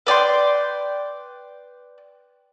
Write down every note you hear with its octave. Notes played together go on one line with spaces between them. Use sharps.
B4 D5 G5 C6